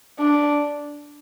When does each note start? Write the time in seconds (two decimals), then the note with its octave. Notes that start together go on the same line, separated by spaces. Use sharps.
0.19 D4